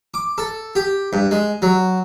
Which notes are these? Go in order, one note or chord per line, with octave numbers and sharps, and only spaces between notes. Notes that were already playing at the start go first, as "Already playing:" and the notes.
D6
A4
G4
G2
G#3
F#3